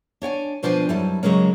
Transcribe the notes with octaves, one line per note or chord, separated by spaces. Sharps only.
D4 C#5 G5 G#5
B2 F3 D4 C5 D5 G#5
F#2 G3 E4 A5
C#3 F#3 G#3 A#3 C#4